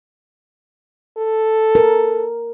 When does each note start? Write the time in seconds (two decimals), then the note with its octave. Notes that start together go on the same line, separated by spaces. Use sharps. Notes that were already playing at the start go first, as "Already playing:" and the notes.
1.18 A4
1.75 A#4